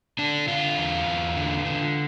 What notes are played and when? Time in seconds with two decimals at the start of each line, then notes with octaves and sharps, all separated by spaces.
0.18 D3 D4
0.48 D3 F4
0.77 E2
1.06 E2
1.36 D3
1.65 D3